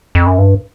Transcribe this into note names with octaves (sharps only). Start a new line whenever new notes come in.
F2
F#2
G2